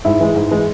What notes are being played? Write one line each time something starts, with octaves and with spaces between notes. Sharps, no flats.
G#2 E4
E3 G#3
G#2
E3 G#3